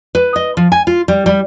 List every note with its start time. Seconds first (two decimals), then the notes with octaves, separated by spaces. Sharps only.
0.15 B4
0.36 D#5
0.57 F3
0.72 G#5
0.87 F4
1.08 G3
1.26 G3